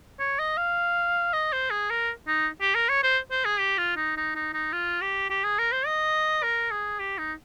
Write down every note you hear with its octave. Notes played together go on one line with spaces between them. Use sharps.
C#5
D#5
F5
D#5
C5
G#4
A#4
D#4
G4
A#4
C#5
C5
C5
G#4
G4
F4
D#4
D#4
D#4
D#4
F4
G4
G4
G#4
A#4
C5
D#5
A#4
G#4
G4
D#4